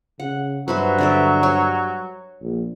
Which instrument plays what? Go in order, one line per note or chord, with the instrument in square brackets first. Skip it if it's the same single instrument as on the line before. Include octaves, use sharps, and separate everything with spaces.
[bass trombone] C#3 [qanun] F#5
[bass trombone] G2 [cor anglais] F#3 [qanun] B4 C5 E5
[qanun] D3 D5 E5
C#5 G#5
[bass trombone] A#1